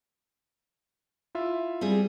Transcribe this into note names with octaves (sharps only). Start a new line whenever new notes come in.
E4 F4 E5
G3 C4 G#4